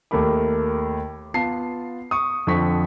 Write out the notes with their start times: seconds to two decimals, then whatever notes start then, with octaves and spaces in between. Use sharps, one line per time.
0.11 D#2 A3 A#4 B5 D6
1.34 B3 F4 A5 C7
2.11 C#6 D#6
2.47 F2 D3 F3 C#6 B6